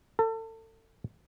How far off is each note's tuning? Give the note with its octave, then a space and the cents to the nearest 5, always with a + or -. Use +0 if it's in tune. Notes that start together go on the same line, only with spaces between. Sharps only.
A4 +30